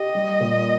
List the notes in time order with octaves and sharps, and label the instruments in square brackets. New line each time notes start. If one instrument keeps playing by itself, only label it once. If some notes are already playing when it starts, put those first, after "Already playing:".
Already playing: [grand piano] G4 [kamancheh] D#5
[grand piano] G3
A#2